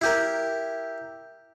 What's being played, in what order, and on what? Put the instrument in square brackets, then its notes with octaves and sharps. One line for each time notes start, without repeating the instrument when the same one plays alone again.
[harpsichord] E4 G4 A#4